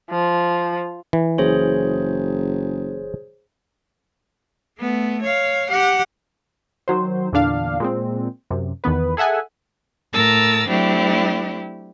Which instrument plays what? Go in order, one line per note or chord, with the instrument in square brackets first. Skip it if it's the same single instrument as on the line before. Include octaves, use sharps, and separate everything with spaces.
[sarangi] F3
[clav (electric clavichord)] E3
[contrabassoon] F#1 [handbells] G#4 C5 C#5
[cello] A3 B3
C#5 F5
G4 F#5
[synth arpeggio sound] D#3 F#3 C5
E2 A#2 D3 D4 F5
A#2 G#3 C4
F#2 C3
E2 D#3 B3 B4
G#4 A4 E5 F#5 G#5
[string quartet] A2 A#4 A5 E6 A6
F#3 A3 C4 D4 E4 G4